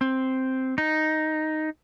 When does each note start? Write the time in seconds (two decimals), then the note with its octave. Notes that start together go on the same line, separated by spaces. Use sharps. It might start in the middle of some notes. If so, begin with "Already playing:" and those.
0.01 C4
0.78 D#4